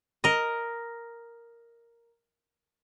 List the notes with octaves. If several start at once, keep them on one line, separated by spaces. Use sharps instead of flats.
A#4 D#5